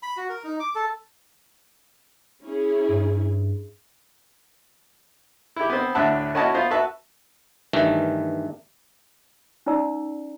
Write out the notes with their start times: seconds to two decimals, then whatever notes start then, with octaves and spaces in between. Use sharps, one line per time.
0.03 B5
0.17 F#4
0.29 A#4
0.44 D#4
0.60 D6
0.75 A4
2.44 C#4 E4 G#4
2.88 G2
5.56 E4 G4
5.70 B3 C4
5.95 D2 A2 D4 E5 F#5 A5
6.35 C#4 E4 F#4 D#5 F#5 A5
6.54 B3 F4 C5
6.70 F#4 B4 E5 A5
7.73 G2 D#3 E3 A3
9.66 C#4 D#4 D5 A#5 E6